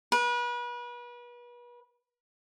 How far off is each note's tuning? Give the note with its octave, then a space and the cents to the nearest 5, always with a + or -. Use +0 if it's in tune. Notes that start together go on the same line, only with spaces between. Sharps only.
B4 -35